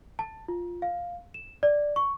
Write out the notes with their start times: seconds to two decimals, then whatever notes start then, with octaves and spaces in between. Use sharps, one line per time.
0.19 A5
0.48 F4
0.82 F5
1.34 E7
1.63 D5
1.96 C#6